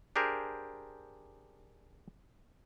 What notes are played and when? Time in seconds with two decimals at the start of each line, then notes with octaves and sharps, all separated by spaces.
0.16 D4 G4 G#4 A#4 C5